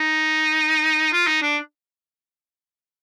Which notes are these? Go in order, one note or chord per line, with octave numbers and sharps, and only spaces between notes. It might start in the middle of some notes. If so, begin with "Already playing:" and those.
Already playing: D#4
F4
D#4
D4